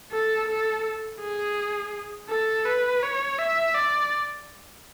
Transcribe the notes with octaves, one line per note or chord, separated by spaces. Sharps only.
A4
A4
G#4
A4
B4
C#5
E5
D5